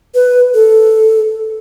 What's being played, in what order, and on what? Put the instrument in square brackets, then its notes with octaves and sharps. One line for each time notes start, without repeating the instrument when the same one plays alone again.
[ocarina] B4
A4